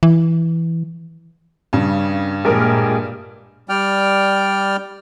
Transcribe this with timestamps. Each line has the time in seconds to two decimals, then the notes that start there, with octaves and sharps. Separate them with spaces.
0.03 E3
1.73 G2 C#3
2.45 A#1 A#2 G#3 G4 G#4 A#4 F6
3.69 G3 D5 G5 F6